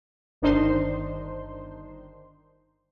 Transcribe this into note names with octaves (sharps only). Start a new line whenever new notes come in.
G1 D#3 D4 D#4 C5 C6